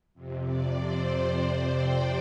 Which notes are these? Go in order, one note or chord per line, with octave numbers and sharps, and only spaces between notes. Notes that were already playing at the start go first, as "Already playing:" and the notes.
F2 C3
D5
C5
D5
G5